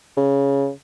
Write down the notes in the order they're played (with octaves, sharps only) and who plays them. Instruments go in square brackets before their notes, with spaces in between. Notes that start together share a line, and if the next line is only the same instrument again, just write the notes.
[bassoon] C#3